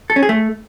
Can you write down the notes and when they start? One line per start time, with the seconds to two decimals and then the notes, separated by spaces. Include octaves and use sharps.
0.10 A4
0.16 C#4
0.23 G#4
0.29 A3